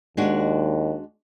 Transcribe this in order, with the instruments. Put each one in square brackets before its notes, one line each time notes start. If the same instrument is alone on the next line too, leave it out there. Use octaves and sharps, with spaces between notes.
[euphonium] D#2 [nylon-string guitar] G#3 D4 F#4